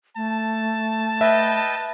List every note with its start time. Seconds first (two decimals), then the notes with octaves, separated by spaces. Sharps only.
0.16 A3 A5
1.21 B4 D#5 E5 G5